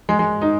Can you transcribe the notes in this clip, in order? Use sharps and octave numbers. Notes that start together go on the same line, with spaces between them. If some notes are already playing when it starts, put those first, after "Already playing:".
G#3
G#3
D#4